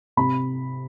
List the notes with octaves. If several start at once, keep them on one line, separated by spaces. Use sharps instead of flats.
C3 B5